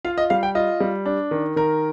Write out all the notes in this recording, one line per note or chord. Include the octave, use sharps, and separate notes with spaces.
F4 F5
D#5
G3 F5
G5
F4 D#5
G3
D4
D#3
D#3 A#4